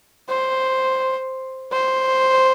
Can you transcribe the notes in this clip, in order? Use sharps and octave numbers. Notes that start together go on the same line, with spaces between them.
C5
C5